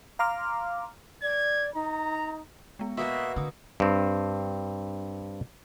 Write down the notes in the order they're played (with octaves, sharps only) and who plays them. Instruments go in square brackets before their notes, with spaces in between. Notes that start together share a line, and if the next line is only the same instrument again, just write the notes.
[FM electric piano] F5 A#5 C6 D6 F6
[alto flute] D5 [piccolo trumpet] G#6
[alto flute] D#4 [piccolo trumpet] A#5
[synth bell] G#3 B3
[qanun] B2 A#3 F#4 [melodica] E5 [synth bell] C#6 D#6
[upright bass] D3 [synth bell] D#6 E6
[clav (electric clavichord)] G2 C4